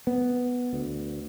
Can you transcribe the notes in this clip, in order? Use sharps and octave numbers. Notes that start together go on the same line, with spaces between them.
B3
D2